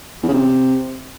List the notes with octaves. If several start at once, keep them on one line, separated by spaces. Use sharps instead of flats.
E2
C#3
C3